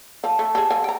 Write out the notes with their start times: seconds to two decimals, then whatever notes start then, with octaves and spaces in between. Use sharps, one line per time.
0.24 F3 A5
0.39 A3
0.55 G4 G#4
0.70 F3 G#5
0.84 G5 A#5